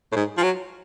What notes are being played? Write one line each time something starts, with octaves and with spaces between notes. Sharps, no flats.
A2
G#2
F3
F#3